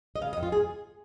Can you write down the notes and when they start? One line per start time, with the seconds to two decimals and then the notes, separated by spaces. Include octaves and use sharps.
0.16 D#5
0.21 C#3 F5
0.33 D#5
0.37 F2
0.43 F4
0.52 G#4